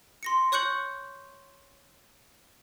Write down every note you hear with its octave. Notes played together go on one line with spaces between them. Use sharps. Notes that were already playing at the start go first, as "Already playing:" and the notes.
C6 A#6 C#7
C#5 C#6 F#6 G6 C#7 F#7